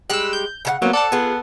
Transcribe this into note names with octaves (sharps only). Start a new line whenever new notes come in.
G3 G#3 G4 E6 F#6
G6
C#3 A4 F#5
F#3 A#3 B3 C5
A4 D5 F#5 A5
B3 F4 G#4